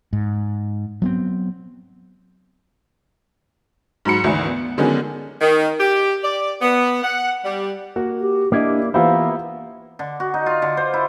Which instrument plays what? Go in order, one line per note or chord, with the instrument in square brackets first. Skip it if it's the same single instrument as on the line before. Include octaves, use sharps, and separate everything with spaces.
[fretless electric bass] G#2
F#3 B3 C4
[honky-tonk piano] G#2 F#3 B5 C#7
G#1 D2 E3
B3
D3 D#3 F#3 G#3 B3 C#4
[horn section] D#3
G4
D5
B3
F#5
G3
[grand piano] A#3 F#4
[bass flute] G4
[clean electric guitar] A#3 E4 D5 [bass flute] D4 [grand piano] G4 D#5
[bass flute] E3 [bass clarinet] A#3 [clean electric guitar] B3 E4 [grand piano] F4 G4 C5
[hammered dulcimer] D3
F#4
D#4
F4
D3
C5
E4